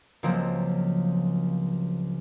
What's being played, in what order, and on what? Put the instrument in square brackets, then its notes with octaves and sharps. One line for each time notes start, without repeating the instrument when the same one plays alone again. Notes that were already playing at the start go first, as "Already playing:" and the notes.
[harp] C#2 F3 F#3 A#3 C4